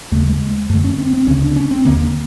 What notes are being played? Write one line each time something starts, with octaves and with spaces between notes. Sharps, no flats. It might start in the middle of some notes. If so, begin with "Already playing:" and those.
D#2 C#3 A3
G#3
F#2 D3 A3
C#4
C4
C4
D2 C#3 C#4
D4
C#4
C4
D#2 D3 A#3